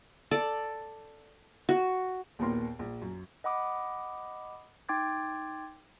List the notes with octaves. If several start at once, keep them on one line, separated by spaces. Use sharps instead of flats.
A4 D5
F#4
A#1 D#2 A#2 B3 A#4 C6
A#1
F#2
D#5 F#5 B5 D6 D#6
D#4 G5 C6 D6 G#6 A6